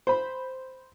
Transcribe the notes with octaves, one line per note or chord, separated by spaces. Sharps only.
C5 B5